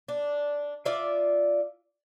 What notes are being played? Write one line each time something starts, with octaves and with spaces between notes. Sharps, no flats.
D4
F4 D5 E5